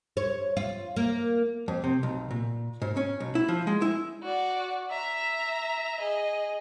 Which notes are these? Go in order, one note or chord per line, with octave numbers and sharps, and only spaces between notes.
C#5
F4
A#3
F2
C3
B1
A#2
G#2
C#4
B1
E4
F3
G#3
E4
F#4 D5
E5 A#5
G#4 D#5